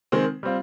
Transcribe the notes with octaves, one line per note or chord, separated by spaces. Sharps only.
D#3 G#3 C4
G3 C4 F4